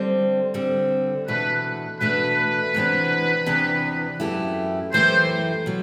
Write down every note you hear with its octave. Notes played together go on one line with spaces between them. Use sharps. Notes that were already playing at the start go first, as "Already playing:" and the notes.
Already playing: D3 G3 C4
D3 G3 C4
E2 B2 A3 D4 B4
E2 B2 A3 D4 B4
E2 C3 E3 B3 D4
E2 C3 E3 B3 D4
F#2 E3 A3 E4 G4
F#2 E3 A3 E4 G4 C5
B2 F#3